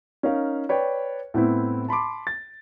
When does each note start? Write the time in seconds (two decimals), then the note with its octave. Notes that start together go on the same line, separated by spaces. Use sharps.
0.23 C#4 D#4 A#4 F5
0.69 B4 C#5 D5 G5
1.34 A2 B3 C4 E4
1.88 A5 B5 C6 D6
2.27 A6